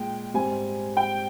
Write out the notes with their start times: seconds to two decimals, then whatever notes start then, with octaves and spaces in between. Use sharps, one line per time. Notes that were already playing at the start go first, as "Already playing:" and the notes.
Already playing: A#2 G#3 G5
0.34 G#2 G3 C4 G#5
0.97 G5